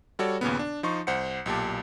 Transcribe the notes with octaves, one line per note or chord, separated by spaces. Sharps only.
G3 F#4 A4 C#5 D5
D#2 A#2 C#3 B3
D4
F3 D#4 C6 C#6
C2 C5 F#5 C#7
B1 A#2 G4 A5